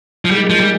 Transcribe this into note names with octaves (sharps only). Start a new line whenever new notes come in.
F3
A#2 G3 G#3 D#4 G#4
F3
G3